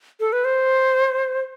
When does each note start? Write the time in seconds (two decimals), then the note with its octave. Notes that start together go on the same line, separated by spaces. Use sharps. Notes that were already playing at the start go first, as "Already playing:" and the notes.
0.20 A4
0.33 B4
0.45 C5